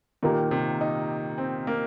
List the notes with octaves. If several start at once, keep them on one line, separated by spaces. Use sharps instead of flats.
A#2 D#3 A#3 G4 A#4
C3
D#4
C4
A#3